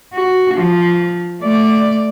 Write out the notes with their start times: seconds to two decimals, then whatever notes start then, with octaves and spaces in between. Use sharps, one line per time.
0.14 F#4
0.54 F3
1.42 A3 D5